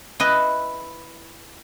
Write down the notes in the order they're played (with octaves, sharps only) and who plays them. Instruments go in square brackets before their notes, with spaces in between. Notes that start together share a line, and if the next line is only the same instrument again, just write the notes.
[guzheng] E4 B4 D#5